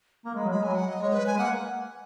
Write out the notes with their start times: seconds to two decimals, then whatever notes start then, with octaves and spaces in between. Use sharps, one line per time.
0.25 A#3 A#5
0.35 G#3 B5
0.44 F#3
0.51 G#3 B5
0.63 F#3 G#5
0.75 F#5
0.89 D#5
1.01 G#3 C#5
1.13 B4
1.26 G#5
1.35 G#3
1.39 A#3 F#5